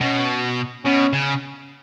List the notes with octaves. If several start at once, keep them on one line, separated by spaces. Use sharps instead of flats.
B2 C#4
B2 C#4
C#3